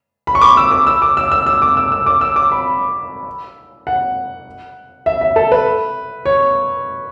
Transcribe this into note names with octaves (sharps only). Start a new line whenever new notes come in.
B5
C#6
D6
E6
D6
E6
D6
E6
E6
E6
D6
E6
E6
D6
E6
D6
B5
F#5
E5
E5
A4
B4
C#5